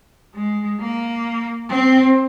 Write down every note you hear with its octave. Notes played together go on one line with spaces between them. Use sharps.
G#3
A#3
C4